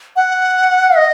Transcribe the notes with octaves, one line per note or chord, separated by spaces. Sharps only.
F#5
D#5